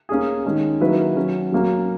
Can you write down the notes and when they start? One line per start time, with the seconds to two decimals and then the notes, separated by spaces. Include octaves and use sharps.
0.09 A#3 C#4 G#4
0.44 D#3 G#3 C#4 G#4
0.81 D#3 F#3 A#3 E4 B4
1.16 F#3 C#4 F#4
1.52 F#3 A#3 C#4 F#4